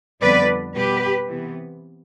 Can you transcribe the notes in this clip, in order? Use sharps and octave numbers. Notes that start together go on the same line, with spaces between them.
F2 D3 G3 B3 B4 D5
B2 G3 B3 G4 B4
C3 E3 B3